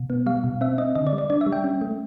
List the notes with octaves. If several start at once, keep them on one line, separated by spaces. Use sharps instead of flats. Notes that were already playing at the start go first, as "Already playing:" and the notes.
Already playing: B2
B3
G3 F5
B2
C4 E5
C4 D#5
D3 D#5
D5
G3
D5
D4 D5
E5
G3
G5
C#4
A3